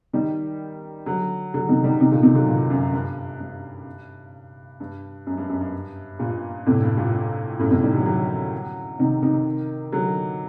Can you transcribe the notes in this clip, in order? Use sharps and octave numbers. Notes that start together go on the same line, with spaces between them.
D#3 G3
D3 F#3
D3 F#3
C3 D#3
D#3 G3
C3 D#3
A#2 D3
C3 D#3
D3 F#3
G2 A#2
F#2
G2
G2
G2
F#2
G2
F#2
G2
G2 A#2
A2 C3
G2
G2 A#2
G2
F#2 A2
A2 C3
D#3 G3
D3 F#3
D3 F#3
C3 D#3
C3 D#3
D3 F#3